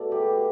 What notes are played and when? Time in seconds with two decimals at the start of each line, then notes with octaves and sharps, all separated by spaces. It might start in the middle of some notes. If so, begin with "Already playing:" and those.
Already playing: B2 A3 A4 D5
0.12 G4 B4